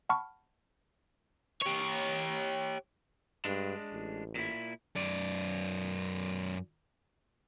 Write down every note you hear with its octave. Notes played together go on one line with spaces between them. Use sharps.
F#5 A5 B5 C#6 F6
G4 C#5
G2 G#3 D4
A1
A#2 E4
F#2 D5